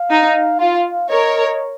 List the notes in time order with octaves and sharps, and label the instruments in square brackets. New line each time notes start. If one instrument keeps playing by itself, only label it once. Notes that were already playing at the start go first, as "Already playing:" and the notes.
Already playing: [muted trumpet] F5
[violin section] D#4
[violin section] F4 [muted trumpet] F5
[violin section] A#4 C#5 [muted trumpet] D#5